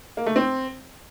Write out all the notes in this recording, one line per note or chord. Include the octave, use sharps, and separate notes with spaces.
A#3
A3
C4